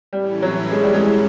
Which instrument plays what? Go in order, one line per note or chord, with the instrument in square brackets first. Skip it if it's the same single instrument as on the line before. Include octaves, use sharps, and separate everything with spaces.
[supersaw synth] A2 E3 A3 C#4 E4 [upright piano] G3
[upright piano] F#3
G#3
G3
G#3